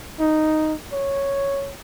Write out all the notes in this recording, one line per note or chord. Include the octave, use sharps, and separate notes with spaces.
D#4
C#5